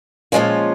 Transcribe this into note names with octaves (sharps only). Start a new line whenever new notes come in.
A#2 F3 G#3 C#4 F4